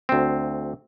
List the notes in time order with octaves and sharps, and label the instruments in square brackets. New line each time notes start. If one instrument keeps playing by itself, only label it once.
[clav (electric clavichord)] D2 C4